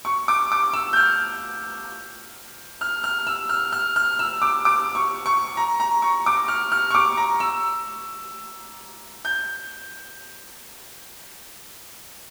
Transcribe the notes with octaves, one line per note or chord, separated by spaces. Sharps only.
C#6
D6
D6
E6
G6
F6
F6
F6
E6
F6
F6
F6
E6
D6
D6
C#6
C#6
A#5
A#5
C#6
D6
F6
F6
C#6
D6
A#5
E6
G6